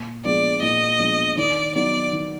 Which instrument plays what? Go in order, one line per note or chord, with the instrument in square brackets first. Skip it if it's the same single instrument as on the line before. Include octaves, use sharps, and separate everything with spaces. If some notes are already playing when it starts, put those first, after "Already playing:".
Already playing: [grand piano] A#2
[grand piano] F3 G#3 B3 D4 [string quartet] D5
[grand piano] A#2 [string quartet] D#5
[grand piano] F3 G#3 B3 D4
[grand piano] D#3 [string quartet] D5
[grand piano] F#3 B3 D#4 [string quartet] D5
[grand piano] D#3